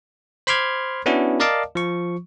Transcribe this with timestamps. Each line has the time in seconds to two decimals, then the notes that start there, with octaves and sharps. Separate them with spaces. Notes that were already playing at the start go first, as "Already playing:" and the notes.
0.47 C5 B5 C6 D6 F6 G#6
1.06 B3 C#4 D4 E4 F#4
1.40 A#4 D5 D#5 F5 A5 D6
1.75 F3 C#6